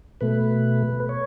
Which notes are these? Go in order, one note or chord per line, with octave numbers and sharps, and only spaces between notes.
B2 A3 B4
C#5